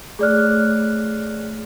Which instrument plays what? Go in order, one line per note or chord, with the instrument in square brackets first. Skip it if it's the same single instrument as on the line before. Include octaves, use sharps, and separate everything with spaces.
[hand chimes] A3 C#5 F#6 [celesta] G#4 D5 F6